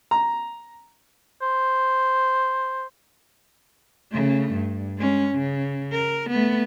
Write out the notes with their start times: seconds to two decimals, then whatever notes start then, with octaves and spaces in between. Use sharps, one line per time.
0.11 A#5
1.42 C5
4.11 C#3 A3
4.53 G2
4.98 G#3 C#4
5.35 C#3
5.92 A#4
6.30 A3 B3